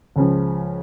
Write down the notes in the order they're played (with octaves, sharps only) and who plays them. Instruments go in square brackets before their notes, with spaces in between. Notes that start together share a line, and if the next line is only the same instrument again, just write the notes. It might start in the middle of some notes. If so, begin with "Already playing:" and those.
[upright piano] C#2 C#3 F3